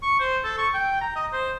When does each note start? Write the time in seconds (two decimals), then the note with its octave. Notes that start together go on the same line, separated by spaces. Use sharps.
0.02 C#6
0.20 C5
0.44 A4
0.58 C#6
0.74 G5
1.01 A#5
1.16 D#5
1.33 C5